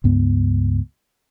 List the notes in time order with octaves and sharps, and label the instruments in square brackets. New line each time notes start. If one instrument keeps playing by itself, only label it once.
[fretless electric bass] C#2 G2 B3